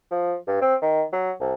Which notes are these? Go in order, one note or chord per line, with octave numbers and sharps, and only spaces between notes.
F3
G2
C4
D#3
F#3
C2